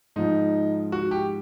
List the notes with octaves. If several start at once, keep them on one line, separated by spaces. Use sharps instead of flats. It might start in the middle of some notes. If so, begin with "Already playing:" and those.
G#2 F3 D#4
F#4
G4